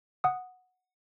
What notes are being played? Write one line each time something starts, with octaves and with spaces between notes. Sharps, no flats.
F#5 D#6